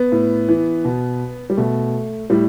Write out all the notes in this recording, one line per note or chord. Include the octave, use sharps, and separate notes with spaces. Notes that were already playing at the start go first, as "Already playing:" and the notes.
Already playing: B3
A2
E3
B2
G3
B2 A3
A2 G3